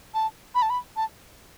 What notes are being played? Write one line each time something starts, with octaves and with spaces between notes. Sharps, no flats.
A5
B5
A5
B5
A5